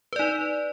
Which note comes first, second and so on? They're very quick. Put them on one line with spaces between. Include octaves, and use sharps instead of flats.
B4 D5 D#4